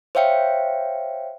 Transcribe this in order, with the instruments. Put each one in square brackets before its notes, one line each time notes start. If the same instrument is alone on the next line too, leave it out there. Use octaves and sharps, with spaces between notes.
[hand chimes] C5 C#5 E5 F5 G5 C#7